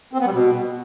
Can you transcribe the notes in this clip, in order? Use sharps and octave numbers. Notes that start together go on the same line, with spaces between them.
C4
B3
G3
B2